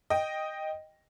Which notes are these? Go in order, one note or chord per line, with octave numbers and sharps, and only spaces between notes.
D#5 G5